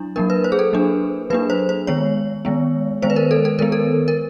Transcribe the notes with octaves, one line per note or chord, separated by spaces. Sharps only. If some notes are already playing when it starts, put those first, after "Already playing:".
Already playing: F#3 D4 E4
F#3 A#3 D4 A#4
B4
C5
G#4
A4
F#3 A#3 D4
F#3 A#3 D4 B4
C5
C5
D#3 G#3 B3 C#5
D#3 G#3 B3
D#3 G#3 B3 C5
B4
A#4
A4
A4
D#3 G#3 B3 A#4
A4
A#4